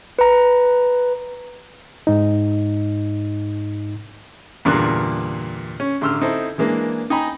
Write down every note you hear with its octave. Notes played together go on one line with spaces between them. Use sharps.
B4 A#5
G#2 D#4
E2 G2 A#2 D3 A#3 F#6
C#4
A1 D3 C6 E6 F6
C4 D#4 E4 A4 C5
E3 G#3 A#3 D4
D#4 D#5 G5 G#5 A#5 B5